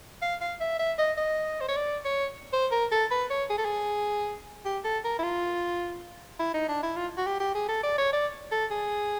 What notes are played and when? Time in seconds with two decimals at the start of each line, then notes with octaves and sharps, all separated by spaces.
0.22 F5
0.41 F5
0.60 E5
0.79 E5
0.98 D#5
1.17 D#5
1.61 C5
1.68 C#5
1.76 D5
2.05 C#5
2.53 C5
2.72 A#4
2.92 A4
3.11 B4
3.30 C#5
3.50 G#4
3.58 A4
3.65 G#4
4.65 G4
4.84 A4
5.04 A#4
5.19 E4
5.23 F4
6.39 E4
6.54 D#4
6.68 D4
6.83 E4
6.96 F4
7.17 F#4
7.26 G4
7.40 G4
7.55 G#4
7.69 A4
7.83 D5
7.98 C#5
8.13 D5
8.51 A4
8.70 G#4